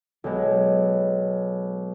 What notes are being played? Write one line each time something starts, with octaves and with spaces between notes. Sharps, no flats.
B1 G#3